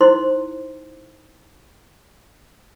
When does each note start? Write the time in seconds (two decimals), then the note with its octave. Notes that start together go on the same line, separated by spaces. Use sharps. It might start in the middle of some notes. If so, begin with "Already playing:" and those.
0.01 D#4 E4 C5 C6